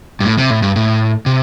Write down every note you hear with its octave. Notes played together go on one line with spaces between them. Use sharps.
G2
A2
C3
A2
G2
A2
C3